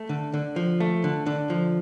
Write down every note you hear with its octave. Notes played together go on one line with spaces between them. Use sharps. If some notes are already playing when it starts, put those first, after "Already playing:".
Already playing: A3
D3
D3
F3
A3
D3
D3
F3